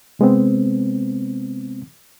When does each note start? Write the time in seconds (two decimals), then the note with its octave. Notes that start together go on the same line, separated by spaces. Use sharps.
0.19 C3 G#3 B3 C4